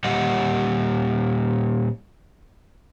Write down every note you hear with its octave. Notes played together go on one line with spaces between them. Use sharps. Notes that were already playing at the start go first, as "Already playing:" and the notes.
A#2 G3 G4 D#5 F#5